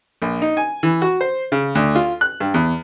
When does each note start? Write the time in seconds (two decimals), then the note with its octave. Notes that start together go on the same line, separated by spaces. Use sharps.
0.22 A#1
0.42 D#4
0.57 G#5
0.83 E3
1.02 F#4
1.21 C5
1.52 C#3
1.75 D2
1.95 F4
2.21 F#6
2.40 G2
2.54 E2